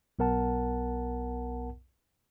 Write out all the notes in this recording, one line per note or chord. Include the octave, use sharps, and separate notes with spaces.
B1 B3 A#4 F#5 A5